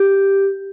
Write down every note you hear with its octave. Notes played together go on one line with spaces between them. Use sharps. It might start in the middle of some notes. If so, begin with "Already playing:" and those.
Already playing: G4